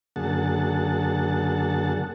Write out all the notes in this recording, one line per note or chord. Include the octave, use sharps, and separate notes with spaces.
F#2 D3 A#3 G#4 F#5 A5